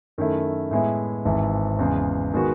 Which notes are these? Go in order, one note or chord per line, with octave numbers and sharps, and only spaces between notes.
F#2 D#3 A3 E4
A2 G#3 B3 E4
G#1 G#2 E3
E2 C#3 G#3
D#3 G#3 B3 F#4